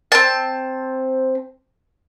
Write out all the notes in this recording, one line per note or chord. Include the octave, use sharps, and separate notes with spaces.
C4 A5